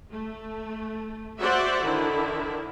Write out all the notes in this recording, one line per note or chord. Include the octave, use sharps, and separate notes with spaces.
A3
F#4 C5 D5 E5 F#5
D3 D#3 E4